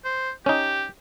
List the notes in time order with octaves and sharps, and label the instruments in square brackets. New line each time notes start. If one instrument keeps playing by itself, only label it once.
[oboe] C5
[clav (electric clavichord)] C#4 D#4 [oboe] G4